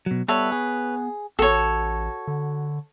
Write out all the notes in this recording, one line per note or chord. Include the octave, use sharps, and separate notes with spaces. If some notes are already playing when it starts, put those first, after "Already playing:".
B2 F#3
G3 B3 A4 B4 C#5 E5
G#4
A1 F#4 A4 C#5
D3